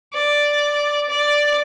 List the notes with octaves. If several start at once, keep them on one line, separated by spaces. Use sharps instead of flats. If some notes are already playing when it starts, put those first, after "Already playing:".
D5
D5